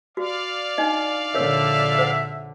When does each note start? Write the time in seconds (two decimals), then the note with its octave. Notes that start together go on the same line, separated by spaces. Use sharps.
0.17 F#4 D5 F5
0.78 D4 D#4 D#5
1.34 A#1 D3 A#4 C#5 E5
1.99 C5 F#5